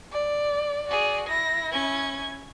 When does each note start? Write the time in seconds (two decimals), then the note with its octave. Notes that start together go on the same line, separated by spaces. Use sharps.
0.11 D5
0.87 F#4 G#4 D5
1.28 E4 A#6
1.72 C#4 G#6